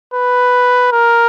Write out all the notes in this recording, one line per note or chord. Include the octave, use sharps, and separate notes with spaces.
B4
A#4